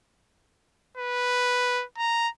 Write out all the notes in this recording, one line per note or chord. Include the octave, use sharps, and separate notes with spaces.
B4
A#5